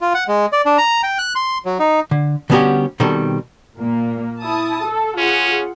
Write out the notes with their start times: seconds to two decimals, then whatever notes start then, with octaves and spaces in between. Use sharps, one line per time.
0.01 F4
0.14 F#5
0.28 G#3
0.52 D5
0.66 D4
0.78 A#5
1.03 G5
1.19 F#6
1.35 C6
1.65 F#3
1.79 D#4
2.11 D3
2.50 D3 G3 B3 C#4 F#4 G4
3.00 B2 D#3 G3 C4 A4
3.78 A#2 A#3
4.43 E4 A5 D#6
4.85 A4
5.18 C#4 F4 G#4 F#5